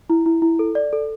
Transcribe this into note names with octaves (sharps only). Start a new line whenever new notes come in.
E4
E4
E4
A4
D5
A4